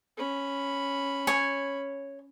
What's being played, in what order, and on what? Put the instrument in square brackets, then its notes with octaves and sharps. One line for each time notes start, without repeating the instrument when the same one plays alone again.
[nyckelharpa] C#4 B5
[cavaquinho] C#5 G#5